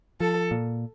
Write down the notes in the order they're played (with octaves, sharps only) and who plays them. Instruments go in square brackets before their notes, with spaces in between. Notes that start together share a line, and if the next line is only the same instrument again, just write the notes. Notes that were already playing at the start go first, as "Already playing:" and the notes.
[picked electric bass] F3 [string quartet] A4
[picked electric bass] A#2